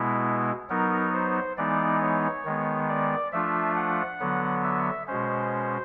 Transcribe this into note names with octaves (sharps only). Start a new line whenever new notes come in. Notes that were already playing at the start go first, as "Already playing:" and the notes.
Already playing: B2 G#3 B3 E4
F#3 B3 D#4 A#4
C5
E3 G#3 B3 D#4 D5
C#5
D#3 G#3 B3
D5
F3 A3 D4 F4 E5
F#5
D3 F#3 B3
E5
B2 G#3 C#4 C5